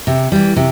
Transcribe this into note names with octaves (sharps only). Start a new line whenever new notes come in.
C3
E3 G3
C3